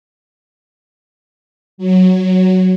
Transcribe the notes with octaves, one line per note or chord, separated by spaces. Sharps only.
F#3